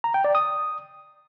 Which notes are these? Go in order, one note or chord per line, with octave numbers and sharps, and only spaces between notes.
A#5
G5
D5
D#6